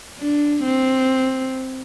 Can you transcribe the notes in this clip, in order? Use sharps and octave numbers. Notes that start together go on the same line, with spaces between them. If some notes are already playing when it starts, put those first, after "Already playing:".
D4
C4